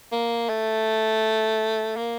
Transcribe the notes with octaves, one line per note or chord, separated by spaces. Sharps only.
A#3
A3
A#3